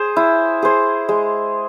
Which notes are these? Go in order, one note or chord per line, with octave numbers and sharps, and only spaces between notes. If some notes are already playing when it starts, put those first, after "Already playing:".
Already playing: G#4 C5
E4
G#4 C5
G#3